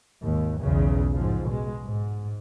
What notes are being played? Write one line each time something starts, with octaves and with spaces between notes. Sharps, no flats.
G#1 D#2
B1 E2 C#3
G#2 F3
B2 G#3
G#2